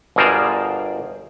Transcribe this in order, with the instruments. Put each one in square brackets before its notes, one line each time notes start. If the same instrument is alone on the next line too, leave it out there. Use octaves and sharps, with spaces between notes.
[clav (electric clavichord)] G1 B2 G#4 A#4 C5 D5